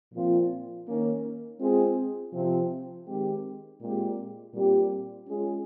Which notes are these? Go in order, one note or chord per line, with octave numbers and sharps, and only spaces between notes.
A#2 F3 C4 F4
D#3 A#3 C#4
G#3 C4 F4 G#4
C3 F3 C4
D#3 G#3 C4 G4
A#2 G#3 C4 G4
A#2 G3 C4 G4
G#3 C#4 F4 G#4